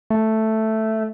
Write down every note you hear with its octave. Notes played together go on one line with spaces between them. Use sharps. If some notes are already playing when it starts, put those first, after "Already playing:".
A3